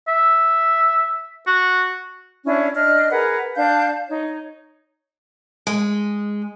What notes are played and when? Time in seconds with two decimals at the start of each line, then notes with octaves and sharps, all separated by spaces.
0.08 E5
1.47 F#4
2.45 C#4 D4 E4 C#5
2.75 D4 D#5 F6
3.10 G#4 A#4 B4 F#5
3.56 D4 F5 A5 G6
4.07 D#4 C#5
5.67 G#3